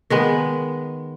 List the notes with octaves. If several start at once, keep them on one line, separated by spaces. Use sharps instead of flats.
D#3 G#3 B3